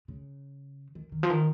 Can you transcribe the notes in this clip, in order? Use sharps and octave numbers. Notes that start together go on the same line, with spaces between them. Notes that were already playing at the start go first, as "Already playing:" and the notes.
C#3
D#3
D#3
F3
D#3